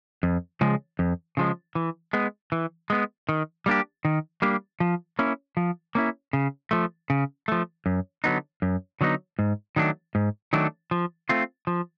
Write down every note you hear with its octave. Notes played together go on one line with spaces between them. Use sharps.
F2
C#3 F3 G#3
F2
C#3 F3 G#3
E3
G#3 B3
E3
G#3 B3
D#3
G3 A#3 D4 G4
D#3
G3 A#3 D4 G4
F3
A#3 C#4 E4
F3
A#3 C#4 E4
C#3
F3 A3
C#3
F3 A3
F#2
D3 F#3 B3 D#4
F#2
D3 F#3 B3 D#4
G#2
D#3 F#3 A3 D4
G#2
D#3 F#3 A3 D4
F3
A3 C4 F4
F3